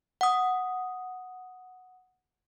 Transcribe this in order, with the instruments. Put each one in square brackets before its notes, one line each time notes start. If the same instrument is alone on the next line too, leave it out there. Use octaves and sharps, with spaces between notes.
[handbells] F#5 D#6